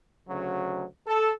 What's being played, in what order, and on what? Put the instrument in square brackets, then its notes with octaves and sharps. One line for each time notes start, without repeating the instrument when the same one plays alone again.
[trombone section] D2 C#3 F#3
A4